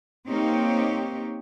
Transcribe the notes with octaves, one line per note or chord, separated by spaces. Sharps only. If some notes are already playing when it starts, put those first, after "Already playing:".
A#3 C4 D#4 G4 C#5